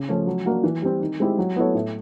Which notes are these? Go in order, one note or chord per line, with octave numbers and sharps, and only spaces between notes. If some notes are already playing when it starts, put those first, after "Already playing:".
Already playing: C#3
F3 A3 C#4
F#3
A#3 D4 F#4
E3
G3 C4
D#3
G#3 C4 E4 G4
F#3
B3 E4 A4 C#5
A2